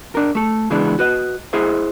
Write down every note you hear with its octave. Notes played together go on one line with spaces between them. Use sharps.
D4 A#4
A3 A4
C#3 E3 G#3 B3 D4 E4
F#4 B4 D#5
E4 G#4 C5 D#5 E5